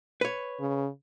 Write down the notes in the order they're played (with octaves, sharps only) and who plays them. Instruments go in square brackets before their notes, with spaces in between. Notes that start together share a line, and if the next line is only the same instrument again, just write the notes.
[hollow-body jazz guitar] B4 C#5
[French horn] C#3